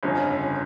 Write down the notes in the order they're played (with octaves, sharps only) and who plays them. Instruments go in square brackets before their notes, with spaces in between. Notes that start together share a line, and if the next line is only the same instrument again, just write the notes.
[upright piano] G1 F2 C#3 [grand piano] C#4